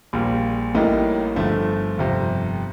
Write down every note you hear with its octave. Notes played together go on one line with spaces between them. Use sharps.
A#1 A#2 G3
A1 A2 G3 A#3 D#4
G1 G2 D3 F3 A3
G1 F2 C3 G3